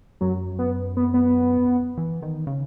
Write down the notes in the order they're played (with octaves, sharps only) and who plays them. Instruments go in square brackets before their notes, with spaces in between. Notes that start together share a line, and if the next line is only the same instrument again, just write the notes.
[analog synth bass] F#2 [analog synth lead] F#3
[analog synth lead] B3
B3
B3
[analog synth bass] E3
D#3
C#3